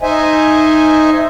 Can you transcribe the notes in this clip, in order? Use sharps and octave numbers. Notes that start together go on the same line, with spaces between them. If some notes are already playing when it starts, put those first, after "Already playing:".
D#4 C5 D#5 E5 G#5